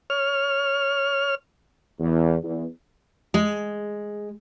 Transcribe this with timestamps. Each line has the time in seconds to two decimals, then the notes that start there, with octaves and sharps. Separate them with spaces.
0.10 C#5 F6
2.00 E2
2.43 E2
3.34 G#3